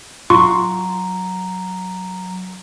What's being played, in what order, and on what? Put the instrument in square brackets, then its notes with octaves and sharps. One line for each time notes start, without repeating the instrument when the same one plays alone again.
[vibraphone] F#3 A#5 [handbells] F4 C6 C#6